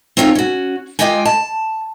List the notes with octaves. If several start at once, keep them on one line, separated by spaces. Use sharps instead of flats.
C4 C#4 D#4 F4 A4 C#5
C#4 F#4
G#3 F4 G4 D#5 G5 G#5
A5